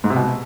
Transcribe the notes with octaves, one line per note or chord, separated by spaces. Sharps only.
G#2
C3
B2